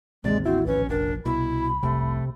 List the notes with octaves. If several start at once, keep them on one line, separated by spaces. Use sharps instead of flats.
A1 D#2 C3 G#3 D5
C4 E4 F#4
A#1 C#4 B4
F1 D4 A#4
C2 B2 E4 B5
F1 C2 C3 A3